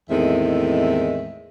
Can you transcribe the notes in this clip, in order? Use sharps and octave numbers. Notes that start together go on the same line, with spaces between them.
E2 A2 D#3 G#3 C4 E5